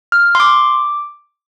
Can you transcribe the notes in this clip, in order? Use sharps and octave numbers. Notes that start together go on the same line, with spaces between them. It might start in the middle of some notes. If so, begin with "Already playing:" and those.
F6
C6
D6